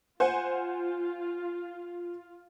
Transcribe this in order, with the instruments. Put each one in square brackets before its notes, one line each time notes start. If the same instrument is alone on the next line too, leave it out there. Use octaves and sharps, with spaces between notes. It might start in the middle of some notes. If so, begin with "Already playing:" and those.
[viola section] F4 [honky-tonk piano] C5 F#5 G#5